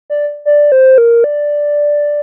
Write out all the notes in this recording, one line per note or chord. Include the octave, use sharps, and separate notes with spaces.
D5
D5
C5
A#4
D5